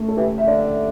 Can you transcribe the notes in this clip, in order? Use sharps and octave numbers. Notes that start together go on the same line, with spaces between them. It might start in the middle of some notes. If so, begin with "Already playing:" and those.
Already playing: A3
A4
E3 G4
E5
D3 D5